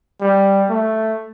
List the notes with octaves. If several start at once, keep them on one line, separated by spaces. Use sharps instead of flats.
G3
A3